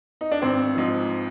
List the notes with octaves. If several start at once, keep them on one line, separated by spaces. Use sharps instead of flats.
D#4
D4
G#1 C4
G#2 F3